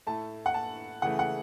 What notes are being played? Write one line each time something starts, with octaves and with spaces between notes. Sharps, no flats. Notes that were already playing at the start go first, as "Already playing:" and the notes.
A2 A3 A5
F#5
A5
C#3 E3 A3 F#5
F#5